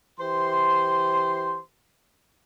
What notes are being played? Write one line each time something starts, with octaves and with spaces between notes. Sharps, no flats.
E3 G4 C5 C6